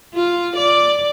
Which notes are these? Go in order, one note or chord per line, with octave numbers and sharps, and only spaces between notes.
F4
D5